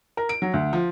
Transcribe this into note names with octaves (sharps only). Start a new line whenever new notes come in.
A#4
D7
F#3
D2
F3